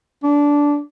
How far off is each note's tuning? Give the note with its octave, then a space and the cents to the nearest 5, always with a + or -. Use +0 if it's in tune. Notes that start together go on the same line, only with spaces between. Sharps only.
D4 -15